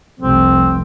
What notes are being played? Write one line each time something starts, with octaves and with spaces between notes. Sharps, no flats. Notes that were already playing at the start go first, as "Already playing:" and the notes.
F1 C2 C4